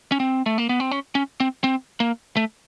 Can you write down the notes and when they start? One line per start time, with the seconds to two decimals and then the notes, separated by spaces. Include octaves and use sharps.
0.12 C#4
0.20 C4
0.46 A3
0.58 A#3
0.69 B3
0.80 C4
0.91 C#4
1.15 C#4
1.40 C4
1.64 C4
2.00 A#3
2.37 A3